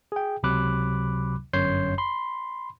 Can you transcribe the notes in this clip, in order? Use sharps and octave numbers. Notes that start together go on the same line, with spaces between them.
G#4 G5
C#2 C3 F#3 B5 D6 F#6
G1 F#2 C#5 C6 G6 C7
B5 C6